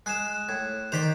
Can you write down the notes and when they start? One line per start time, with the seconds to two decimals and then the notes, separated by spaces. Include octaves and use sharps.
0.06 G#3 G#4 F#6 E7
0.49 A2 G#6
0.92 D#3 C5 D5 G5 B6 F7